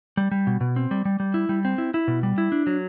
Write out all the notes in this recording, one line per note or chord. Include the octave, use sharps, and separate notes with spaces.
G3
G3
B2
B2
C4
G3
G3
G3
E4
G3
C4
E4
E4
B2
G3
E4
D4
F#3